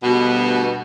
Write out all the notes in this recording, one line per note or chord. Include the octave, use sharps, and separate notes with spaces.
D2 G2 B2